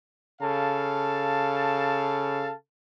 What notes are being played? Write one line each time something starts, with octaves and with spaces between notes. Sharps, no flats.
C#3 A4 F5 A5